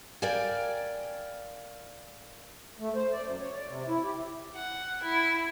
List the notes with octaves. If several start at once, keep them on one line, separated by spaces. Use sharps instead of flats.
A#4 D5 F5 G5 G#5
A3
C5
D5
F#2
C#5
D5
C3
E4
G4
F#5
E4